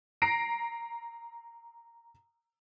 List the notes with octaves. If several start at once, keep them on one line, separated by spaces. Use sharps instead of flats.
A#5 A#6 C7 D7